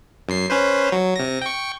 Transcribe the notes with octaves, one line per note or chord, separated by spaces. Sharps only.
F#2 C7
C#4 B4 C5
F#3
C3 A#6
G5 C#6